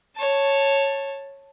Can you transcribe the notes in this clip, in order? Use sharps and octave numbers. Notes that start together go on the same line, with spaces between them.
C#5 A5